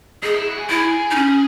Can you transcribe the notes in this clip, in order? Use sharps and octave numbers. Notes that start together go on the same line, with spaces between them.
D#4 G#4
E4
F#4
G#4
E4 G#4
D#4
C#4